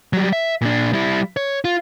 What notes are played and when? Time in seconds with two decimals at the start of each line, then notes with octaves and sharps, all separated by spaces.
0.13 F#3 G3
0.33 E5
0.62 A#2 D4
0.93 G3 E4
1.37 C#5
1.65 F4